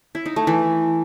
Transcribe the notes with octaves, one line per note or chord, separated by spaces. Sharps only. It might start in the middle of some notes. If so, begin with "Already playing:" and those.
E4
D#4
A3
E3